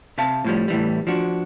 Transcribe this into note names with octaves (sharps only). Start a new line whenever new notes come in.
C3 E5 F5 A5
A2 F3 G3
A2 E3 G3
F3 D4 F#4